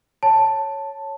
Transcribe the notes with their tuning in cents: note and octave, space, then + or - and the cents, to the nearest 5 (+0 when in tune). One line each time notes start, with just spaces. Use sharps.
C#5 +0 A5 +5